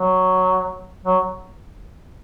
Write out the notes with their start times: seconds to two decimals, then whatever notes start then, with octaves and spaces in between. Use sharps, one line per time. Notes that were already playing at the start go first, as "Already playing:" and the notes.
Already playing: F#3
1.05 F#3